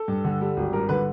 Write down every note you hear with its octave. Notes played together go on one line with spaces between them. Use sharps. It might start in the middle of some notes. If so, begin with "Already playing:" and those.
Already playing: A4
G2
D3
G3
G#1
G2 A#4
D3 B4